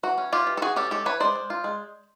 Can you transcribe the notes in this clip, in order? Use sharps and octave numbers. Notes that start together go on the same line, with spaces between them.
E3 F#4
C#4
E3 F4 G4
E3
A4
E3 F#4 G#4
C#4 G4 A4
G#3 G4 A4
E3 B4 C#5
G#3 C5 D5
G#3
F4
G#3